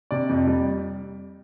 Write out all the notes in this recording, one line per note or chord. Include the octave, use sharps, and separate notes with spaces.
C3 D5
F2
G3